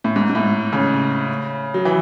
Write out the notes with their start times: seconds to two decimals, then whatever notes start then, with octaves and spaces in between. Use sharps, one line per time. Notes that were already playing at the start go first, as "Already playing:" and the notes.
0.04 A2
0.16 G#2
0.29 G#2
0.35 A2
0.73 C#3
1.74 F#3
1.85 E3